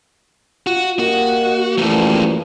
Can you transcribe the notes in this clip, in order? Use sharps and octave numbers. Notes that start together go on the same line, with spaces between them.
F4 F#4
A#3 F#4 G4 D#5 F#5
F#2 E3 F3 G3 A3 A#3